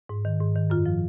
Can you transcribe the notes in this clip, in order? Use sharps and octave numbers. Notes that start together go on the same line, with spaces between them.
G#2
D#3
G#2
D#3
F#2 F4
F3